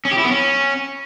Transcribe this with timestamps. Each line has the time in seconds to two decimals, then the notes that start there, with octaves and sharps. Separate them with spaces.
0.05 C#4
0.12 G4
0.18 E4
0.25 B3
0.31 C#4